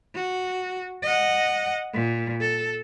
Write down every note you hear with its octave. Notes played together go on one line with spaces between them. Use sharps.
F#4
D#5 F#5
A#2
A4